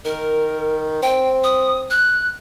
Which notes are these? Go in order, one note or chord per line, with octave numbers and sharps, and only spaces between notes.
D#3 A#4
C4 G5
D#6
F#6